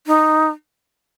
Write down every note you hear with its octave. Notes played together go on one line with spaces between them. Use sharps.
D#4